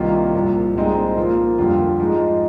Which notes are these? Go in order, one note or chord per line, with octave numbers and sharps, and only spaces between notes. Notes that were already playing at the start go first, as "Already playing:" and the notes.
Already playing: C2 C3 D#3 A#3 F4
C2 A#2 F3
C2 A#2 G#3 C4 D#4
A#2 F3 A#3 F4
F2 D3 G3 F4
G#2 F3 G#3 D#4